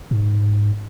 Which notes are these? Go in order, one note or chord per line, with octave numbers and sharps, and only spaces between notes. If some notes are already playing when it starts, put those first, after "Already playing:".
G#2